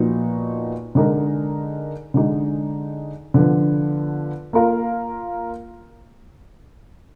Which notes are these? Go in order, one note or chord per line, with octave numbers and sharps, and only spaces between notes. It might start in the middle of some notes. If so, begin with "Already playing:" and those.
Already playing: A#2 F3 B3 D#4 F#4
D3 G#3 D#4 A#4
D3 G#3 D#4
D3 F3 B3
A#3 F4 A#4 F5